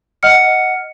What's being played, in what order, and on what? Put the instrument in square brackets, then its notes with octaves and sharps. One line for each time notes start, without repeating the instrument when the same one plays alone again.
[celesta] D#5 F#5 F6 C#7